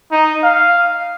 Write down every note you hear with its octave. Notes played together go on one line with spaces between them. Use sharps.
D#4
F5